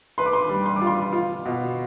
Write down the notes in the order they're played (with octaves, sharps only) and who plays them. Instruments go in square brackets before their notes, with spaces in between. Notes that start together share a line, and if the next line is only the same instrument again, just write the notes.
[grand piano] B4 [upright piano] C6
[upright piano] D6
C6
[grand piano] G3
[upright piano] C6
D6
[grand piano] F4
[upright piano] C6
[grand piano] F4
B2